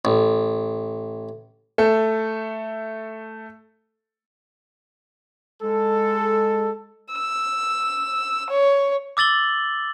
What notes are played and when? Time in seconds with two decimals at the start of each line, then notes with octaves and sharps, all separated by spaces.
0.05 A1
1.78 A3 A4
5.63 G#3 A4
7.13 E6
8.50 C#5
9.17 D6 E6 A6 F#7 G7